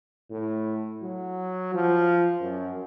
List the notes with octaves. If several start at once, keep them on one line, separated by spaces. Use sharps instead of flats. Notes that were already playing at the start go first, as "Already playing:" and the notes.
A2
F#3
F3
F#2